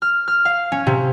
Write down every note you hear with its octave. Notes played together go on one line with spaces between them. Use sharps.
F6
F6
F5
C#4
C3